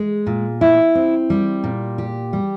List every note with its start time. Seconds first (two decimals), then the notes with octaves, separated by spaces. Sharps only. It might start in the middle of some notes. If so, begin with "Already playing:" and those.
Already playing: G#3
0.27 A#2
0.61 E4
0.95 C4
1.30 G3
1.64 A#2
1.98 G4
2.33 G3